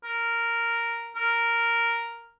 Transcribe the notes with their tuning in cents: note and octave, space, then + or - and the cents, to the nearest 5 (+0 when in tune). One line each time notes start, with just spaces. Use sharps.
A#4 -5
A#4 -5